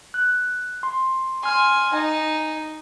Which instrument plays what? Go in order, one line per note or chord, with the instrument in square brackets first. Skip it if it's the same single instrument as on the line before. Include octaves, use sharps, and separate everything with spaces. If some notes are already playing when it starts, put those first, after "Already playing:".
[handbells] F#6
C6
[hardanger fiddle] G#5 [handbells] C6 F6
[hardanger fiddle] D#4 [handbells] G#5